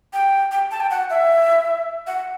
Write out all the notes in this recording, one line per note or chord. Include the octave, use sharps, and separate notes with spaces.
G5
G5
A5
G5
F#5
E5
F#5